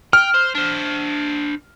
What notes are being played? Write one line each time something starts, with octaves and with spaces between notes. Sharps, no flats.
G5 F6
C5
D4 C5